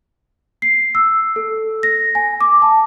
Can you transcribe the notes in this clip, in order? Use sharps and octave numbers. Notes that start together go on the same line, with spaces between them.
C7
E6
A4
A#6
G#5
D6
A5